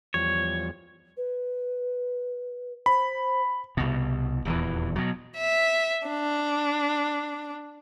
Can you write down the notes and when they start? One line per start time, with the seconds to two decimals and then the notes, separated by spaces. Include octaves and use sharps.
0.14 E2 F3 G3 C#5
1.17 B4
2.86 C5 B5
3.77 C2 B2
4.45 D#1 E2 E3
4.96 B2 F#3
5.37 E5
6.07 D4